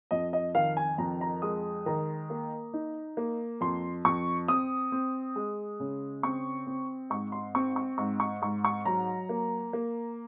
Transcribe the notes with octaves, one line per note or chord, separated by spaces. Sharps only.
F2 D#5
D#5
D#3 F5
G#5
F2 A#5
A#5
G#3 D#6
D#3 A#5
A#3
D#4
A#3
F2 C6
F2 C#6
C4 D#6
C4
G#3
C#3
C4 C#6
C4
G#2 C#6
C6
C4 C#6
C#6
G#2 C#6
C#6
G#2 C#6
C#6
F#3 A#5
A#3
A#3